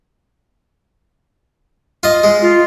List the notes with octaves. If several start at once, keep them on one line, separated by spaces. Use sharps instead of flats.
F4 D#5
G#3
F4